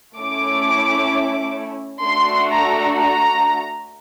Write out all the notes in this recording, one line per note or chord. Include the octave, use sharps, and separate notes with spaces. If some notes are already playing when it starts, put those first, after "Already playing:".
A3 C#4 E4 D6
A3 D4 F#4 C6
A#5
A#5